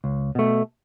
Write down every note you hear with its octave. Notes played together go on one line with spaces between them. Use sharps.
C#2
B2 A3